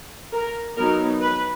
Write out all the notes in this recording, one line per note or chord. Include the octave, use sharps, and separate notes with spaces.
A#4
F#3 B3 D#4 A#4
B4